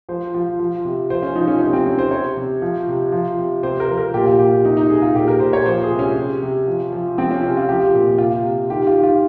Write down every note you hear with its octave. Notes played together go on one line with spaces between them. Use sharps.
F3 C5
F3
F3
C3
F3 C5
C#4
F3 D#4
C#4
D#4
C3
C#4
C4
C3 C#4
C5
C3 C#5
C3
F3
C3
F3
C3
C3 C5
A#4
F3
A#4
A#2 G4
F4
A#2 G4
C3 D#4
D#4
C3 G#4
F4
A#2 G4
A#4
A#2 C5
C#5
F3 C5
G#4
C3
C#4
C3
C3
F3
F3
F3 C4
C#4
C3 C#4
F4
F3 G4
A#2
C3 F4
C3
D#3 G4
F4
D#3
F4